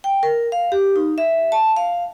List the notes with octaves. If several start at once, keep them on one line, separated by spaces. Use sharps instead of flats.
G5
A#4
F5
G4
D#4
E5
A5
F5